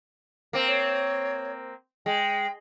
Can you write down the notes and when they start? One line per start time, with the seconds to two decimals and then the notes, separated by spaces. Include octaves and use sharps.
0.53 A#3 C4
0.68 C#5
2.06 G#3 G5